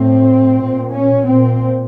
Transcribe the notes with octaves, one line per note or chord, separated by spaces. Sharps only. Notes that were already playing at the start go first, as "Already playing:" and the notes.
Already playing: A2 C4
A#2
C#4
A#2 C4